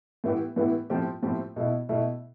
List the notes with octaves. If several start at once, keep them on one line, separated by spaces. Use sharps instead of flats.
A2 E3 B3 E4 G4
A2 E3 B3 E4 G4
A2 F3 A3 C4 G4
A2 F3 A3 C4 G4
B2 A3 E4
B2 A3 E4